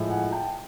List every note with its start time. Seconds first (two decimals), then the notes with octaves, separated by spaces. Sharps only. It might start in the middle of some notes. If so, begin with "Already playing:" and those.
Already playing: A2 F3 G#3
0.10 F#5 G#5
0.32 G5 A5